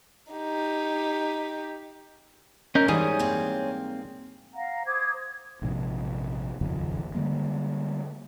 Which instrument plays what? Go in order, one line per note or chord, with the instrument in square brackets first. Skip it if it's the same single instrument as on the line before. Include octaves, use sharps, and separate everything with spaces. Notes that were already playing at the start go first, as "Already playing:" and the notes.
[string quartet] D#4 G4
[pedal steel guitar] C#4 D#5 G6 [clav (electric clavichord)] A#4
[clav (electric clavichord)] G#2 G3 G#4 [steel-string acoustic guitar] E3 [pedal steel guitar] C#5 G#5 D#6
[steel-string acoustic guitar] A#3 C4
[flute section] F5 F#5 A#5
C5 D6 D#6 G#6
[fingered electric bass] A#1 G#2 C3 F3
D#1 G#1 F2 C#3
D3 G3 G#3 A#3